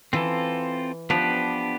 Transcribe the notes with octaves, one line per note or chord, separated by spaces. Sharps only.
E3 C4 F4 A4
F3 B3 D4 G4 B4